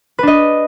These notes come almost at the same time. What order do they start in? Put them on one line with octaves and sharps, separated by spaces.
B4 D4 D#5